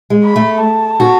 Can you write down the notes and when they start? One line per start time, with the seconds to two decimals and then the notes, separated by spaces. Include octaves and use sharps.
0.10 G#3
0.24 B5
0.36 A3
0.62 A5
1.00 F#4